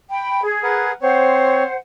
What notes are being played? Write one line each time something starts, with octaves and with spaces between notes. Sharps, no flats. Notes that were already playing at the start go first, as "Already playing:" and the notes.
G5 B5
G#4
A#4 B4 F#5
C4 C5 C#5 F#5